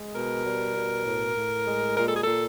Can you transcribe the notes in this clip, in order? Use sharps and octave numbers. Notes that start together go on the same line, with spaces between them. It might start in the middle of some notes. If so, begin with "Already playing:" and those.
Already playing: G#3
B2 A#4
G3
B2
A2
A2
G#3
A#2 A#4
A4
G#4
A#2 A4